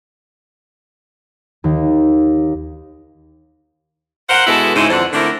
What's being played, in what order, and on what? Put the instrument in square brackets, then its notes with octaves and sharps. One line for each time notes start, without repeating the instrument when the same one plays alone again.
[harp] D#2
[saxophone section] A#4 C5 F5 F#5
B2 G#3 B3 E4 A4
G#2 C#3 G#3 C4 D#4 E4
F2 D3 E3 A4 C5 F#5
D3 A3 C4 D4 E4 A#4